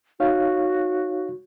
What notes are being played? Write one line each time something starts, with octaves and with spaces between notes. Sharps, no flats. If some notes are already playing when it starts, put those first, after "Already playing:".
D#4 F#4 C#5 F5